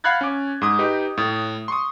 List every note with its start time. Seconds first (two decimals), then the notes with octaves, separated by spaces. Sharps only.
0.04 F5 F#5 B5 F#6 G#6 A6
0.21 C#4 D6
0.62 G#2 D#6
0.79 D#4 G4 B4 D#5
1.18 A2
1.68 C6 C#6 D#6